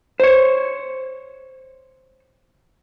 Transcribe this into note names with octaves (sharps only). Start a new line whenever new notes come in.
C5 C#5